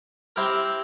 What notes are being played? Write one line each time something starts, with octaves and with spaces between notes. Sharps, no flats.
C4 E4 G4 A#4